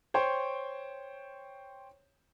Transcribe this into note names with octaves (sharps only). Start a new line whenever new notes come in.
C5 C#5 G5 C6